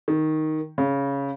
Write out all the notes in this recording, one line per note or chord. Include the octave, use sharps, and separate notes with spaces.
D#3
C#3